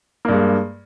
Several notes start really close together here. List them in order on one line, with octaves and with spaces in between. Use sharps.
A#3 G2 G#3